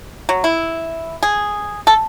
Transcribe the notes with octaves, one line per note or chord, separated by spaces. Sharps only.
F#3
E4
G#4
A4